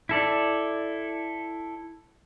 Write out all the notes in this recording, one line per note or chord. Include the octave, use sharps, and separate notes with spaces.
E4 A4 D5